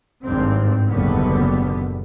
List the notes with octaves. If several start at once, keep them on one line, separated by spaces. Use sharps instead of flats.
G#1 G2 C4
F#1 D#2 A#2 D3 G3 B3